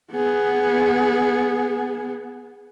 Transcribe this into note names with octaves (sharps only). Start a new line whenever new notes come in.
B3 G#4